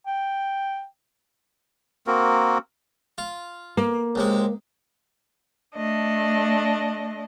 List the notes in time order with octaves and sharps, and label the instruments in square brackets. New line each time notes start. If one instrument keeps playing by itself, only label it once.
[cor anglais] G5
[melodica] A#3 C4 F#4 A#4
[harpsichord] F4
[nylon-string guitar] A#3
[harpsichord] C#2 C3 G#3
[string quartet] A3 D4 D#5